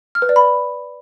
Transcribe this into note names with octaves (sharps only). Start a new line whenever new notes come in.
F6
B4
D5
B5